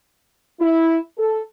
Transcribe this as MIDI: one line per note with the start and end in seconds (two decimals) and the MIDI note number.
0.60 0.97 64
1.18 1.40 69